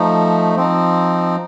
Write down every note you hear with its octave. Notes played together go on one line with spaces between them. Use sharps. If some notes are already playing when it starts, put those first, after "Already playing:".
Already playing: F3 A3 D#4
F3 C4 D#4